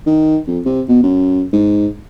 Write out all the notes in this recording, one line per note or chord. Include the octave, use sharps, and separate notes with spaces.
D#3
F2
C3
B2
F#2
G#2